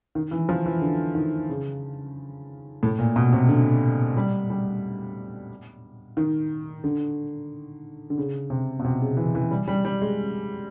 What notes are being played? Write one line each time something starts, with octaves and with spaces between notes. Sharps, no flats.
D#3
E3
F3
E3
D3
D#3
C#3
A2
A#2
B2
C3
D3
G3
G3
D#3
D3
D3
C#3
C3
B2
C3
C#3
E3
E3
G3
G3
G3
G#3